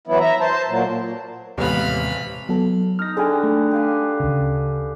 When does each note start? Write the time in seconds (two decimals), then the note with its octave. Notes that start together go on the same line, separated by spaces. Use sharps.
0.07 E3 F#3 B3 E4
0.20 E5 A#5
0.41 C5 A5
0.68 A#2 F#3
1.58 A1 D#2 C3 G#3 B3 F5 B5
2.49 F#3 B3 A4
2.99 D#4 F6 A#6
3.17 D3 G#4 B4 G5 G#5
3.43 A3
3.71 G4 F5 G#5
4.20 D2 C#3